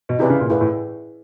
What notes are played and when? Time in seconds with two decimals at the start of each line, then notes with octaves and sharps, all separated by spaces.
0.09 B2
0.19 C3 E4 G#4 B4 D5
0.30 C#3
0.40 A#2
0.50 A2 E4 G#4 B4 D5
0.61 A2